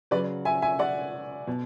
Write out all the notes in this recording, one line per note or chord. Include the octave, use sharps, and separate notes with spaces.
C#3 F#3 B4 D5
E5 G#5
E5 G#5
D5 F#5
B2